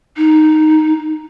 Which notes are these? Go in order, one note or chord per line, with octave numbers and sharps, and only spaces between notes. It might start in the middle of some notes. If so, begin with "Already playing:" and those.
D#4